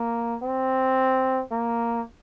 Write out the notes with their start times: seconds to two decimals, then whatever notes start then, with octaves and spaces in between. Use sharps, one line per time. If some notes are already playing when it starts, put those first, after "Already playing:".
Already playing: A#3
0.42 C4
1.51 A#3